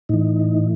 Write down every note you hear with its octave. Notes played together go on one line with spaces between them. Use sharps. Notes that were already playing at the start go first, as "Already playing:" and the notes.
A2 E3 D#4